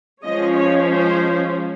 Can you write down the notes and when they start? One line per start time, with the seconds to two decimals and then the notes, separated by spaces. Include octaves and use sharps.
0.24 F3 G#3 C#4 D#5
0.56 C#5
0.89 C5